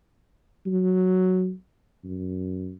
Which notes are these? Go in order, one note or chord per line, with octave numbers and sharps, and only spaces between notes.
F#3
F#2